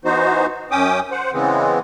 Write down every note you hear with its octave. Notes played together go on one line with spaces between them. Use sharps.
E3 B3 D#4 F#4 C5
F#2 C#4 G5 D6 D#6
C5 F#5
C#3 E3 G#3 B3 C4